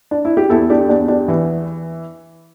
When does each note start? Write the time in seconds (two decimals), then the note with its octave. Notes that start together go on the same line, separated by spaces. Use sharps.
0.11 D4
0.25 E4
0.37 G4
0.50 E2 E4 A4
0.70 D4 G4
0.89 E2 D4
1.08 D4 G4
1.28 E3